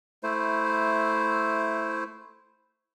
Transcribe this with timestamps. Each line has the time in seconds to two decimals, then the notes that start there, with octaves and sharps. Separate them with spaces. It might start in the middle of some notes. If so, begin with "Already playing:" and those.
0.23 A3 E4 C5